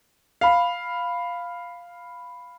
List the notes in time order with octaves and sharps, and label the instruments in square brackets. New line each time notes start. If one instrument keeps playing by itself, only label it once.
[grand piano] F5 B5